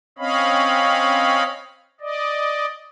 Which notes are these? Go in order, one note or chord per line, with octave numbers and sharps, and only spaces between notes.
C4 C#4 C#5 D#5 F5 B5
D5 D#5